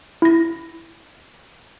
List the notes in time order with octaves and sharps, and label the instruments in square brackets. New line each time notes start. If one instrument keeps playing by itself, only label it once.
[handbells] E4 A#6